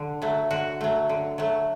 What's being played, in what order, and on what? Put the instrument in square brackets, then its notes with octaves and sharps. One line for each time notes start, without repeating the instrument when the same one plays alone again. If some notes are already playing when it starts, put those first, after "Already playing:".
Already playing: [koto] D3
F#3 A3
D3 F#4
F#3 A3
D3
F#3 A3